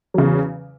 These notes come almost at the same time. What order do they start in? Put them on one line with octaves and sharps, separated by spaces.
F#3 C#3 E2